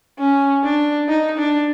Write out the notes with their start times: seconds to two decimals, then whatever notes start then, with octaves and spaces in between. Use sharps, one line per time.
0.19 C#4
0.63 D4
1.08 D#4
1.38 D4